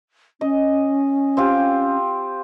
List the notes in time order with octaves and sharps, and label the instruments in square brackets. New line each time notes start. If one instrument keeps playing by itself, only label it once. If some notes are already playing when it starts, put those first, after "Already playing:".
[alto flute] C#4 [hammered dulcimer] D#5
[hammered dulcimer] C4 F4 G4